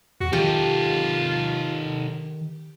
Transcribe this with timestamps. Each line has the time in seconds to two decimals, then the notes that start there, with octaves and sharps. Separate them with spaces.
0.20 E2 F#4
0.33 D#3 D#4 F4 G4 A4